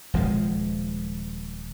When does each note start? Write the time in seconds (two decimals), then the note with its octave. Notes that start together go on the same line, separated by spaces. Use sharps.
0.14 D#1 F3 G#3